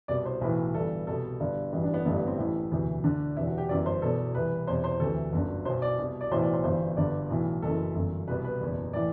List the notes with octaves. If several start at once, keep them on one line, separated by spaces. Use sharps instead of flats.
C2 B2 D5
C5
B1 A2 E3 B4
G1 G2 E3 A4
C2 B2 A4
G1 G2 D3
A1 G2 E3 F#4
D4
B3
A1 G2 D3 A3
B3
C4
A1 A2 E3 E4
E1 D2 C3 E3
D2 D3 D4
E1 E2 C3 E3 E4
F#4
G4
G1 F#2 E3 D5
C5
E1 E2 B2 A4
C2 C3 E3 B4
E1 E2 C3 C5
C5
D2 C3 E3 A4
G1 F#2 D3
B1 B2 C5
D5
C2 B2
D5
B1 A2 E3 C5
D5
C5
G1 G2 E3 C5
G1 G2 D3 D5
B1 A2 E3
F#1 F#2 E3 A4
G1 F#2 E3 A4
C2 B2 B4
B4
F#1 E2 B2
A2 E3 D5